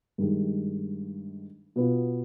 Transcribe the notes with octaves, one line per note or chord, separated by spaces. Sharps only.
G2 D#3 G#3
B2 B3 F4